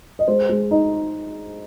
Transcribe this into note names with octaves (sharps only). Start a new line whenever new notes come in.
D#5
G#3 C5
G#3
D#4